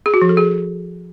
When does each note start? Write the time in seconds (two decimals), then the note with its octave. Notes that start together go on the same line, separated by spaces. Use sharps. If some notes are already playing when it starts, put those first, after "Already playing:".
0.06 G#4
0.14 F#4
0.21 F3
0.29 A4
0.37 G#4